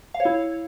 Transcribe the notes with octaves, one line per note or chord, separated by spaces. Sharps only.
F5
C#5
E4